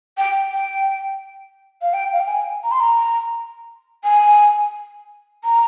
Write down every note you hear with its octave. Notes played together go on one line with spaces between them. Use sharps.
G5
G5
F5
G5
F5
G5
G#5
A#5
C6
A#5
G#5
A#5